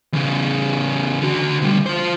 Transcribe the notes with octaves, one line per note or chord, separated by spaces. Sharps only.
E2 C#3
D3 F#4
D2 G3
F4 C5